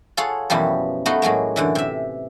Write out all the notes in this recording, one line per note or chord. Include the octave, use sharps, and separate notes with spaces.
F4 G#4 A4 C#5 F5 F#5
F#2 B2 E3 F3 G3
A3 B3 D#4 F#4 D#5 F5
A2 F#3 G#3 A#3
F#2 D3 E3
C3 E5